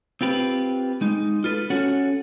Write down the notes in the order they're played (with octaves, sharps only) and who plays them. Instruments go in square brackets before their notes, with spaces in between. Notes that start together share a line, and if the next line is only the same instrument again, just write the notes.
[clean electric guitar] C4 F4 G4 B4
G#3 D#4
F4 A4 B4
C#4 F#4 A4 C#5 F#5